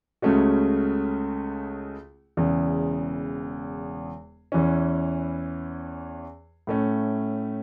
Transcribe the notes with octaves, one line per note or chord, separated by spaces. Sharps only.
C#2 C#3 A3 C#4 F#4
E1 E2 C#3
E2 E3 C#4
A2 A3 C#4